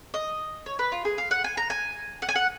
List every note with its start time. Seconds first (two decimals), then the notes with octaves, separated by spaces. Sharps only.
0.14 D#5
0.66 C#5
0.79 B4
0.92 F4
1.05 G#4
1.18 F5
1.31 F#5
1.44 G#5
1.57 A#5
1.70 G#5
2.22 F#5
2.29 G#5
2.35 F#5